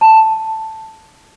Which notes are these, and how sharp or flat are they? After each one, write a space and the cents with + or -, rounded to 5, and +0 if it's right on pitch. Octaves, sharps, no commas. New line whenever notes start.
A5 +5